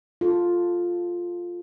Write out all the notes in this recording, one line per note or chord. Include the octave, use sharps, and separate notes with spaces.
F4 A4